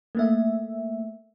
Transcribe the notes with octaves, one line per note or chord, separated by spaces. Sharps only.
A3 A#3 E5